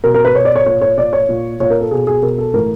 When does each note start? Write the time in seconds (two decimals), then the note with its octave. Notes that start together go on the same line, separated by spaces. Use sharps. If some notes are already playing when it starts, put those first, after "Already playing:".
0.04 B2 A#4
0.14 A#4
0.25 B4
0.35 B2 C#5
0.45 D5
0.56 C#5
0.66 A#2 C#5
0.81 C#5
0.98 A#2 D5
1.13 C#5
1.29 A#2
1.60 A#2 C#5
1.70 A#4
1.81 A4
1.91 B2 G#4
2.07 G#4
2.22 B2 A#4
2.38 A4
2.54 A2 E3 A#4